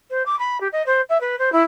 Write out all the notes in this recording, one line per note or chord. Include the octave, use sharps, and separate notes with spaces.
C5
D6
B5
G4
D#5
C5
E5
B4
C5
E4